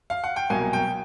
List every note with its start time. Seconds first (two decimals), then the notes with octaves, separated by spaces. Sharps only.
0.10 F5
0.24 F#5
0.36 G5
0.50 C2 B2 F#3 A#3 G#5
0.73 G5